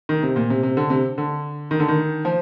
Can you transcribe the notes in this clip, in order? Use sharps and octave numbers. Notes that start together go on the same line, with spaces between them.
D#3
C3
A#2
C3
C3
D3
C3
D3
D#3
D3
D#3
F3